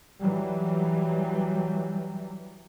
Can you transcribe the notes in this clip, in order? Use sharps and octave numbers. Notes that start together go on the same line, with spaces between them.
E3 F#3 G3